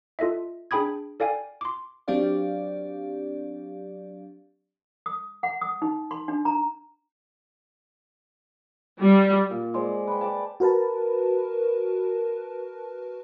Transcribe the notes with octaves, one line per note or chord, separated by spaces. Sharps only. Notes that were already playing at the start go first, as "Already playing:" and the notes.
F4 A4 D#5 E5
D4 G#4 G5 B5 D#6 G#6
A4 D5 F5 G5 G#5
C6 D6
F#3 C4 D4 G4 D5 F5
D#6
F#5
D#6
D#4
C6
D4
A#5
G3
A#2
G#3 C5 D5
B4 G5
D5 G5 A5
F#4 A#4 B4 A5